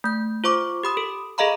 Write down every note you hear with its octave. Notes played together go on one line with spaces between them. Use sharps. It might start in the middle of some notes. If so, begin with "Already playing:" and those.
A3 G6
F4 C5 C#6 D6
G4 B5 D#6
A4
G#4 A4 D#5 F5 A#5 B5